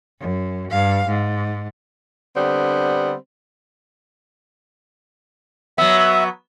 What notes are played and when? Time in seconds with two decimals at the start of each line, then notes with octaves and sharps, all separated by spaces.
0.20 F#2
0.70 G2 F5
1.08 G#2
2.36 D3 G3 B3 C4
5.78 F#3 B3 E5